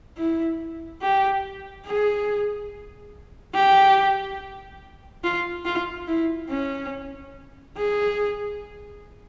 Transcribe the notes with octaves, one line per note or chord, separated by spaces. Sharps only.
E4
G4
G#4
G4
F4
F4
E4
C#4
G#4